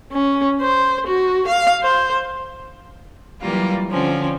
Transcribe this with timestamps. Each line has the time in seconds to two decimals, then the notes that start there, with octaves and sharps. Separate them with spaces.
0.12 C#4
0.61 C5
1.07 F#4
1.48 F5
1.83 C5
3.41 E3 F#3 G3 A#3 F4
3.90 D3 F3 C4 C#4